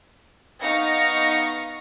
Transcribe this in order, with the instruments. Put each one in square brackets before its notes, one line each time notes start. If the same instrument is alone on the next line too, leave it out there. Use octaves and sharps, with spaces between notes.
[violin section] B3 D#4 F5 C#6 A#6 C#7